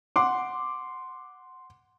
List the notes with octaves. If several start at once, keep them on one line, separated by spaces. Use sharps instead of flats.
F#5 C6 D6